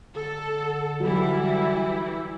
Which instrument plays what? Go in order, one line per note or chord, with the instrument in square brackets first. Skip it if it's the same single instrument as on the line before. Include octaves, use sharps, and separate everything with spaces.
[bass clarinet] D3 [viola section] A4
[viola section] E3 G3 E4 [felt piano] F#3